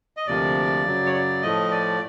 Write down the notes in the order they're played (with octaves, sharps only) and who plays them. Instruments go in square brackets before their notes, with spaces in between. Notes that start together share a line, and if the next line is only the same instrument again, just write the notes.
[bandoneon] D#5
D2 C3 F3 A#3 D5
F#2 C#3 F#3
C#5
D5
A2 F3 A3 D#5
D5